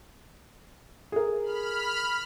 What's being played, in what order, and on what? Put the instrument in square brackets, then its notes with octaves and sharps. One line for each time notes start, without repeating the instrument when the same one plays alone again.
[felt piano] G#4 A#4
[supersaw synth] B5 F6